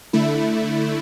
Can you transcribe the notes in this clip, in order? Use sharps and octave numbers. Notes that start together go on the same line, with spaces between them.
D3 A3 E4